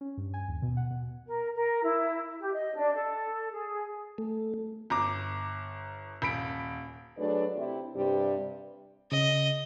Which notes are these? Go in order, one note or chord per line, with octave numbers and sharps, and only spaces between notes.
C#4
G2
G#5
D#2
B2
F#5
B2
A#4
A#4
E4
G4
D#5
D4
A4
G#4
A3
G1 A#5 D6
D#1 B5 B6 D7
F#3 A3 D4 G#4 B4 D5
C3 E4 G4
G2 C3 G3
C#3 D#5